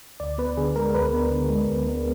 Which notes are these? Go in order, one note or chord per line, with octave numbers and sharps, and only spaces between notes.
D2 D5
B3 B4
D3 G#4
G#3 A#4
D2 B4
B3
D3
G#3
D2
B3